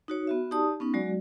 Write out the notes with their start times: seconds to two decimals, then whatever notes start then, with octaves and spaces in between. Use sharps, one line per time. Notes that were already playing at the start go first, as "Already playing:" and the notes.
0.08 D#4 F#4 C#5
0.27 B3 F#4 E5
0.51 D#4 G4 D5 A5 D#6
0.80 B3 C#4 D#4
0.94 F#3 G#3 F#4 D5